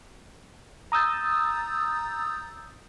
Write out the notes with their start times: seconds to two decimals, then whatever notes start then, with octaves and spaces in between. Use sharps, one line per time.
0.92 A#5 D#6 E6 G6 A6